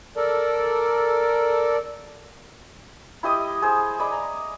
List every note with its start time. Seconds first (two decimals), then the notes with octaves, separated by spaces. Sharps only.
0.17 A4 A#4 D5
3.23 E4 G4 D#5 D#6
3.62 G#4 C5
3.99 D5 D#5 B5
4.12 A#5